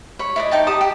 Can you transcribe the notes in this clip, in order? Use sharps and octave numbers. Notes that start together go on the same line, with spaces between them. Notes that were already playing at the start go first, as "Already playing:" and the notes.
C#5 B5
E4 D5 D#5
D#4 G5 A5
G4 A5 D#6
G4